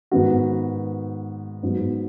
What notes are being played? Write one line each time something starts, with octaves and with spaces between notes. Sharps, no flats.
G#2 D#3 B3 F#4
G#2 F#3 B3 F#4